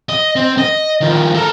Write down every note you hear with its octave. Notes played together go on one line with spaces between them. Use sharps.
D#5
C4
D#5
D#3 F3
A4 A#4